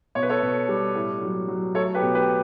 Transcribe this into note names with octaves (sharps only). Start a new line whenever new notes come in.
B2 C#5
B4
A4 C#5
B2
G3
A2
F#3
F#3
A3 A4 C#5
G4 B4
B2
G4 B4